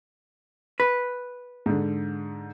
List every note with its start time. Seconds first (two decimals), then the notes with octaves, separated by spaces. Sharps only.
0.80 B4
1.66 G#2 D3